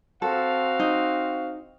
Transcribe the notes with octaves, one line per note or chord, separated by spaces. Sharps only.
C4 F#4 A4 F5
D#4